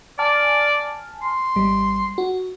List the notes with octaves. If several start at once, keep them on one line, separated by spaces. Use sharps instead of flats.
D5 G#5 A5 F6
C6
G#1 G3
F#4